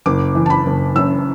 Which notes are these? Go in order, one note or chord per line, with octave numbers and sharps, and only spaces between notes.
F#1 D6
E3
A5
B5
F#1
F#2 E6